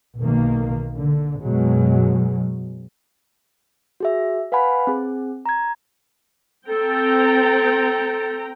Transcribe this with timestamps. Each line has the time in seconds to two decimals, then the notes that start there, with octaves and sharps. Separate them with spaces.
0.20 B1 D#3 A#3
0.95 D3
1.42 F#2 B2 F#3 G#3
4.00 F#4 G#4 E5
4.52 B4 F5 F#5 G#5 B5
4.87 C4 G#4
5.46 A#5 G#6
6.68 C4 A4 G5 A#5